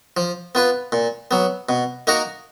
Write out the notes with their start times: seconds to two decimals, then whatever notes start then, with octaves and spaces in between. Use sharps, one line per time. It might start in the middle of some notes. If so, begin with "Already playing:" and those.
0.17 F3
0.55 B3 F4 B4
0.92 A#2
1.31 F#3 B3
1.69 B2
2.07 A#3 D#4 F#4 A#4